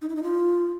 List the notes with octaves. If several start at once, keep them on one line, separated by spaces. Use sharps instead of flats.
D#4
E4
D#4
F4